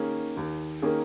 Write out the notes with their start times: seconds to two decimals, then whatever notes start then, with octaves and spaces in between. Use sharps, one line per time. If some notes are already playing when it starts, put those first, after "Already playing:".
Already playing: D#3 A#3 C#4 G#4
0.37 D#2
0.82 D#3 A#3 C#4 G#4